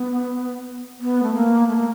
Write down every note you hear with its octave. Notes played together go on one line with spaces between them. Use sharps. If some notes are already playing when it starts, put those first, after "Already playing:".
Already playing: B3
B3
A3
A#3
A3
A#3